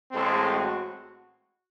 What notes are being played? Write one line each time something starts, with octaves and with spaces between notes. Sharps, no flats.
A1 A2 G#3 C4 A4
F#4